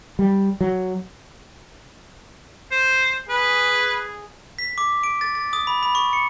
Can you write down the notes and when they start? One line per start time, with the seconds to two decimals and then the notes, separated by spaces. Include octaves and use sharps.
0.19 G3
0.61 F#3
2.71 C5
3.29 G#4 B4
4.59 B6
4.78 D6
5.03 D7
5.21 A6
5.35 A6
5.53 D#6
5.67 B5
5.83 B5
5.95 C#6
6.13 C#7